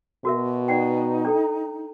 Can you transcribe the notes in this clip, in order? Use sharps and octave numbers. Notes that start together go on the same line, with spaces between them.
B2 F#4 A#4 E5
D#4 D5 F#5 G5
D4 A4 G5